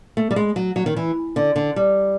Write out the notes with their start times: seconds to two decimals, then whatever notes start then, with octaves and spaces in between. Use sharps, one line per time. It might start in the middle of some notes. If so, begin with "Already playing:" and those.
0.17 A3
0.31 G3
0.36 G#3
0.56 F#3
0.76 F#3
0.86 D#3
0.96 E3
1.36 D3
1.56 D3
1.76 G3